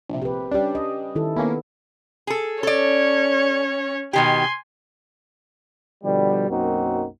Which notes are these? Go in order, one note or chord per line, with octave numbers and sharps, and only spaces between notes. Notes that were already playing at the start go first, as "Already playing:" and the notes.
A#1 C3
G4 B4
G3 C#4 D4 G4
D#5
D#3 E4 A4
A#3 B3 C#4 E4
G#4 A4
C#4 A4 C#5 D5
B2 D#3 G4 G#5 C6
B2 D3 F3 G3
B1 F#2 A#3 C4 D#4 F#4